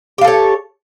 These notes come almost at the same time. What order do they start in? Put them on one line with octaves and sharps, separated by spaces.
G4 F5 A4 C#5